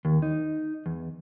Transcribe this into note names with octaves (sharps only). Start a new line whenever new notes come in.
D#2
D#4
E2